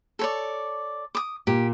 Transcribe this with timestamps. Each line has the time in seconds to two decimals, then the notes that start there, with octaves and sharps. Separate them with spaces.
0.19 A4 C#5 D5
1.15 D6 D#6
1.47 A#2 G4